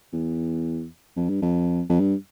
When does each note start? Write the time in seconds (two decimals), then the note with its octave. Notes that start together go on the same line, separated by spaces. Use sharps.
0.13 E2
1.17 F2
1.29 G2
1.42 F2
1.89 F2
2.00 G2